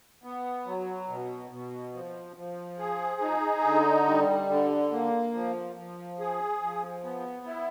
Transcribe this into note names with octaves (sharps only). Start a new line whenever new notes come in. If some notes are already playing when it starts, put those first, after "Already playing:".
B3
F#3
B2
B2
F3
F3
G#4
D#4
D3
G3
D3
A#3
F3
F3
G#4
F3
B3
E4